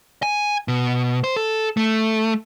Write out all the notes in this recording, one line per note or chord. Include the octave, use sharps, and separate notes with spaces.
G#5
B2
C5
A4
A3